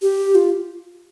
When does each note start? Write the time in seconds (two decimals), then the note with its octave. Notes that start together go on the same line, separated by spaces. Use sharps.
0.02 G4
0.35 F4